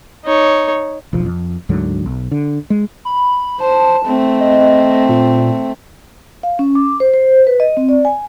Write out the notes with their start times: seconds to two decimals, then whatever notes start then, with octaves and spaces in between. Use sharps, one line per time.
0.25 D#4 C#5
1.13 E1 B1 F3
1.26 F2
1.69 D2 G#2 D3 F#3
2.06 B1
2.31 D3
2.70 G#3
3.05 B5
3.60 C5 A5
4.05 A3 C4
4.40 D#5
5.09 A#2
6.43 F5
6.59 C#4
6.75 D6
7.00 C5
7.14 C5
7.47 B4
7.60 D#5
7.77 C4
7.89 D5
8.05 G#5